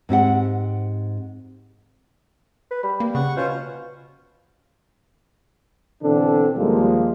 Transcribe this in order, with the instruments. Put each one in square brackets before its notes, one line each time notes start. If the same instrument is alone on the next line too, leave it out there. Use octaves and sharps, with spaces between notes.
[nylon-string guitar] G#2 C4 G4 F#5
[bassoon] B4
[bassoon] G3 [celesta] B5
[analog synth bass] A#3
[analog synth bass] C#3 [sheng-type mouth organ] F#5 C#6
[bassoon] B2 [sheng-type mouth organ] C#4 F4 C5
[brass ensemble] B2 D3 E3 C4 D4 A4
D#2 F3 G3 G#3 A#3